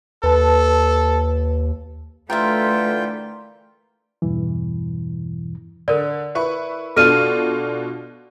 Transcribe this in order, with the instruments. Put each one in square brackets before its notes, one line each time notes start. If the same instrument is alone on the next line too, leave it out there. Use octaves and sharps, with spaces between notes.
[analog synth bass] D#2 [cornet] A4 [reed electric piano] B4 A5
[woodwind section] D3 E3 [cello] A3 [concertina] F4 G5 [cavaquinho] A#4 C5 E5
[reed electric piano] E2 G2 B2 E3
[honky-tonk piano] D3 [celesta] A#4 D5
[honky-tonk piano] E4 B4 C#6
[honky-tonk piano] B2 D4 F4 [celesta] A4 F6 D#7